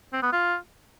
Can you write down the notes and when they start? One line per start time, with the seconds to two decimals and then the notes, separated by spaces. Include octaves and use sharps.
0.13 C4
0.23 B3
0.33 F4